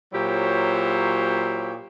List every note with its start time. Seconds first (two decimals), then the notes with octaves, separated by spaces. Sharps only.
0.14 A#2 F#3 E4 G4 C5 C#5